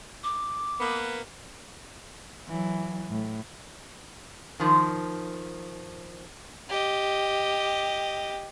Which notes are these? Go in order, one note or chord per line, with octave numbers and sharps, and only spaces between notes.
D6
A#3 B3
E3 F#3
A2
D#3 F3
G4 D#5